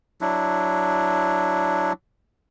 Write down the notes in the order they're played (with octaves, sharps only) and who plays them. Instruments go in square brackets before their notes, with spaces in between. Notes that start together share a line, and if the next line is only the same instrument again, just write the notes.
[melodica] F#3 D4 E4